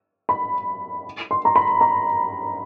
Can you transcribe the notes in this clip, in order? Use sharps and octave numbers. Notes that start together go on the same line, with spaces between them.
B5
C6
A#5
B5
A#5